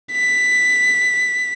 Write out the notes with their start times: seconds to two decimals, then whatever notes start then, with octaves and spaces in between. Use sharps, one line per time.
0.12 B6